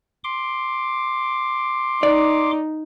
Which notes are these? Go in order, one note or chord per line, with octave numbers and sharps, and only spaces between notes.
C6 D6
D#4 D5